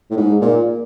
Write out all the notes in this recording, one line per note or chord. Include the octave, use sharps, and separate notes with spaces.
A2
G#2
A#2